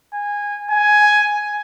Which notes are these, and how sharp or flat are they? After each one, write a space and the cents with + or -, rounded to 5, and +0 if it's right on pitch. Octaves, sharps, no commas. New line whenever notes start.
G#5 -15
G#5 +10